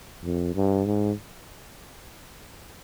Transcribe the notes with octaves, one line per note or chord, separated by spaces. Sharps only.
F2
G2
G#2